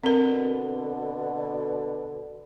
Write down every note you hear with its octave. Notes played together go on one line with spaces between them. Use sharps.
B2 D3 C4 A#4